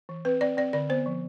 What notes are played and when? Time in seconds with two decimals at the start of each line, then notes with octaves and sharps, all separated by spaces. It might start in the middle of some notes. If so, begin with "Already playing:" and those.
0.09 E3
0.25 C4 B4
0.41 C4 D5
0.57 C4 D5
0.73 D3 D5
0.90 B3 C5
1.06 F3